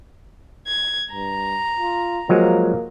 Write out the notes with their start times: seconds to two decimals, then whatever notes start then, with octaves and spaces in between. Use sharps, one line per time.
0.67 G#6
1.12 G2 A#5
1.79 F4
2.29 F3 F#3 G#3 A#3